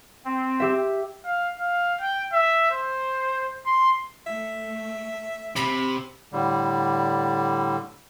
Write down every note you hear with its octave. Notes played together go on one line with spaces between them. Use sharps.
C4
G4 E5
F5
F5
G5
E5
C5
C6
A3 E5
C3 B5
A2 D3 G3